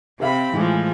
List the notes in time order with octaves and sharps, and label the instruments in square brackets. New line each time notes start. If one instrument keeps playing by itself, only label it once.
[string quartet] C3 C4 B5 [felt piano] G4 E5 F5
[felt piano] A2 G#3 [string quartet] E3 F3